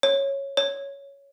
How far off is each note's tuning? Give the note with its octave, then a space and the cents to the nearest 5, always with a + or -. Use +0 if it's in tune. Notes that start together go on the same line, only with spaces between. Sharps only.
C#5 -10
C#5 +5